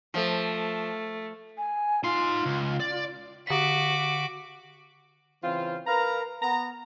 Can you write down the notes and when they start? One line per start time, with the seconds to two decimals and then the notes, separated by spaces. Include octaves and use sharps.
0.14 F3 A3
1.57 G#5
2.04 D#4 F4 C6
2.46 C#2
2.80 D5
3.47 D3 F#4 D6 B6
5.43 C#3 E3 C4 F4
5.86 A#4 B4 F5 A#5
6.41 B3 A#5